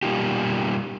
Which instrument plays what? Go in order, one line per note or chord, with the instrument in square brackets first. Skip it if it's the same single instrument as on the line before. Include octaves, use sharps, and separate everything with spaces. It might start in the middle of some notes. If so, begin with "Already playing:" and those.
[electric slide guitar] B2 G3 A#3 D#4 F4 G4